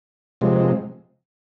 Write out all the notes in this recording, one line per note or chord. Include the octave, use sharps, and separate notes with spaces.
C3 F3 G#3